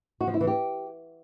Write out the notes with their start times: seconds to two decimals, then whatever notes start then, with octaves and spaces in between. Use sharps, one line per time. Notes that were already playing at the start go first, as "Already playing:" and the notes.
0.21 F#4
0.27 F3
0.34 E4
0.41 E3
0.47 G4